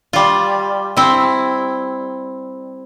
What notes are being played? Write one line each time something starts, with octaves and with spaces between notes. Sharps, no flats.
G3 F4
C4 E4